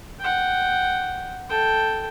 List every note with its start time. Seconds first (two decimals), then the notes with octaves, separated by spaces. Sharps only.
0.20 F#5 G5
1.49 A4 G5